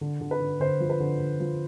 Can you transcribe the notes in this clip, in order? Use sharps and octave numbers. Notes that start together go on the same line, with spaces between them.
D3
D3
B4
D3
D3 C5
F3
B4
D3
D3
F3